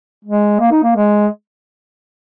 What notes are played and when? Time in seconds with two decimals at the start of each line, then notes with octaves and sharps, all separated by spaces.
0.25 G#3
0.60 A#3
0.71 D#4
0.83 A#3
0.96 G#3